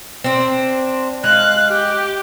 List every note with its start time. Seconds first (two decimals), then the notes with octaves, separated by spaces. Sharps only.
0.24 C4 D4
1.24 G#3 F5 F#6
1.68 G4